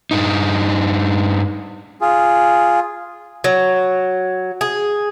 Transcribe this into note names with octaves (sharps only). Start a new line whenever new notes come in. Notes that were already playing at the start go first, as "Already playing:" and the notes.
G2 D#4
F4 G#4
F#3
G#4